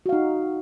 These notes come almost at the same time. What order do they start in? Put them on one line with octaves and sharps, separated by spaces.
F#4 F5 D#4